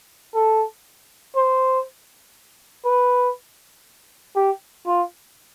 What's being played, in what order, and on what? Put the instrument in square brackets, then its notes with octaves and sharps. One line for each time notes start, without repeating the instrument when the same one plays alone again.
[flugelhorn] A4
C5
B4
G4
F4